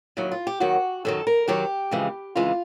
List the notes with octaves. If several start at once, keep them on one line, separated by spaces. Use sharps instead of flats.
D#2 D#3 F#3 E4
F4
G4
D#2 D#3 F#3 F#4
F#2 D#3 F#3 A4
A#4
F#2 D#3 F#3 G4
F2 C#3 E3 G#3
F2 C#3 E3 G#3 F4